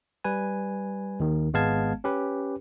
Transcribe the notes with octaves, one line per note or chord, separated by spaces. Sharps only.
G3 B4 G#5
D#2 D#3
G#1 G#3 B3 F5 A5 G#6
C#4 G4 B4